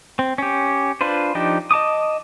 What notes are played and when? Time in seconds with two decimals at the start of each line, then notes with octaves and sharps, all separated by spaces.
0.19 C4
0.38 C#4 G4
1.01 D4 F4 B4 C5
1.35 F3 D4 D#4 G4
1.71 D#5 A5 D6 D#6